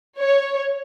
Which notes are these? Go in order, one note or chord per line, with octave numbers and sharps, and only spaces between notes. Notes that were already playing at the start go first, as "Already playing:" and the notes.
C#5